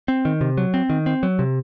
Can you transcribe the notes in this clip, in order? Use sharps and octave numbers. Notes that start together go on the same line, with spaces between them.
C4
D#3
C3
F#3
C4
D#3
C4
F#3
C3